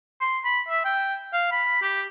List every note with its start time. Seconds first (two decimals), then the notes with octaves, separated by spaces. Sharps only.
0.21 C6
0.44 B5
0.69 E5
0.85 G5
1.33 F5
1.52 B5
1.82 G4